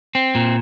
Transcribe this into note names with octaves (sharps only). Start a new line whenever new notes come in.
C4
A#2